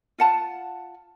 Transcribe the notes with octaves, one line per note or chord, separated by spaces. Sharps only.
F4 F#5 A5